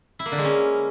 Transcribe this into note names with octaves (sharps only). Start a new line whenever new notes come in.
E4
A#3
D3
G#3
C#4